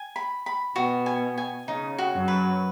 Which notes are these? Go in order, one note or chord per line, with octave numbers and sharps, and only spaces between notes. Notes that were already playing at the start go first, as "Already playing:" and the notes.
Already playing: G#5
B5
B5
B2 B3 F#4
G#5
G#5
C#3 D#4
F#4
F#2 F#3
B4